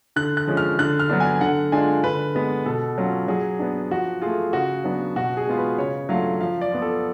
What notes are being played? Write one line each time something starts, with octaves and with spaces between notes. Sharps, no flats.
D3 F#6
F#6
F3 G#3 C#4
F6
D3 F#6
F6
F#3 B3 D4
G#5
D3 F#5
G#3 D4 F4 G#5
D3 B4
G#3 B3
B2 A4
F#3 C#4 F4
F#3 G#4
B3 D4
F3 F#4
A3 F4 G#4
C#3 F#4
F#3 B3 D4
B2 F#4
G#4
G#3 B3 F4
B4
C#3 C#5
F#3 A3 D4 F4 F5
F3 F5
D5
B3 F4
A4